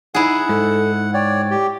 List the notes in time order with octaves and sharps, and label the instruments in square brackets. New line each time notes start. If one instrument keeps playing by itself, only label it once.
[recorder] D#4 [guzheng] E4 G#4 [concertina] F#5
[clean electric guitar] G#2 [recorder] A4
[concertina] C#5 D5 [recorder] G5
[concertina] G4